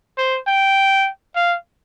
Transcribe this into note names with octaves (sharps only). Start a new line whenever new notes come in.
C5
G5
F5